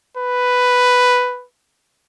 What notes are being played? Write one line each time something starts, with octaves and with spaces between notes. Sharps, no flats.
B4